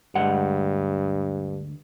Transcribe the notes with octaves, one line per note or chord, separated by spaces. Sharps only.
D2 G2 G#3 F#5